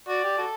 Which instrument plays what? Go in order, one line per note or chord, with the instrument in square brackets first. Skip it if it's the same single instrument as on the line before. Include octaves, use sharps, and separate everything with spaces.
[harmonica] F#4 [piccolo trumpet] D5
[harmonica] G4
F#4 A4